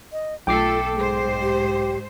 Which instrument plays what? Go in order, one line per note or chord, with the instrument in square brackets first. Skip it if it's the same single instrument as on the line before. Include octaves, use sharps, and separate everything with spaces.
[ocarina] D#5
[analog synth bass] B1 [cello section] A3 A4 [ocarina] F4 [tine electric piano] G5 D6 C7
[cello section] G#2 C5 [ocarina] G#4
[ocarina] G4